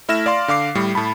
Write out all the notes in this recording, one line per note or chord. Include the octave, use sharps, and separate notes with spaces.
A3 E4 E5 F6 A#6 E7
D5 F5 C6
D3 F5 D6 C7
A2 G3
A2 A5 B5